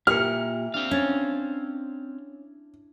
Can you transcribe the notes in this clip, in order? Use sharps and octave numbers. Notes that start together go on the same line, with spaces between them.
A#2 E4 G4 F6 C#7
C4 D4 F5
C#4 G#6 A6